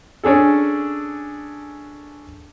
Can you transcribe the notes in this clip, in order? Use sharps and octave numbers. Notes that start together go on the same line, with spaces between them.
C#4 D4 G#4 A4